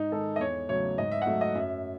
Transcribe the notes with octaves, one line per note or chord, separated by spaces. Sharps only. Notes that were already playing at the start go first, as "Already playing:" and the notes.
Already playing: G#2 D#4
D#3 G#3 A4
D#5
E2 C#5
C#3 F#3 A3 C#5
G#2 D#5
E5
F#5
F#3 A3 E5
D#5
F#2 E5